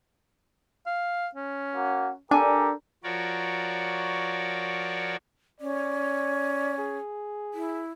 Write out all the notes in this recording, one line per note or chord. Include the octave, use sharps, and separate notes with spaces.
F5
C#4
A#3 F#4
D4 G4 A4 A#4 G#5
F3 F#4 A#4 C#5 D5
C#4 D5
G#4
E4